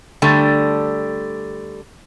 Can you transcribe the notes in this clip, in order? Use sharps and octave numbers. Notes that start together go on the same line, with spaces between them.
D3 G3 A3